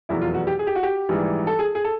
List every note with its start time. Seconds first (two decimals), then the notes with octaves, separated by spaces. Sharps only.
0.09 F1 E2 B2 F#3 E4
0.21 F4
0.34 F#4
0.47 G4
0.59 G#4
0.67 G4
0.75 F#4
0.83 G4
1.09 A#1 G#2 E3 G3
1.47 A4
1.59 G#4
1.75 G#4
1.84 A4